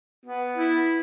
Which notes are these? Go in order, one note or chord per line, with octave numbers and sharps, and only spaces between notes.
B3
E4